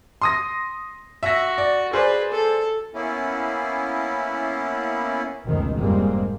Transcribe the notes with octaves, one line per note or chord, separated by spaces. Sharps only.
C6 D#6 A#6
F#4 E5 A#6
D5
G#4 B4 C5 D5
A4
A#3 B3 C#4 E4
F1 C#2 B2 D#3 C4
F1 G#2 G3 G#3 A#3 C4